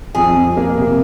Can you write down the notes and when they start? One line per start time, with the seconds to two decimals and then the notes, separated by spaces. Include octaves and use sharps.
0.15 F2 G#4
0.35 F2
0.57 A#3
0.77 C3